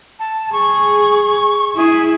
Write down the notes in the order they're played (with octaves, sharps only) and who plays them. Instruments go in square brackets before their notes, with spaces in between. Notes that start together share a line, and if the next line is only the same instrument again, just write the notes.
[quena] A5
[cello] G#4 [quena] C#6
[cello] E4 [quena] G#4